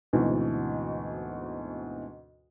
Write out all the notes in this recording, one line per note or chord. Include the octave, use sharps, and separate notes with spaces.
D2 G#2 B2 E3 C4